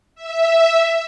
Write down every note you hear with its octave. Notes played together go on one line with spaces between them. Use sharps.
E5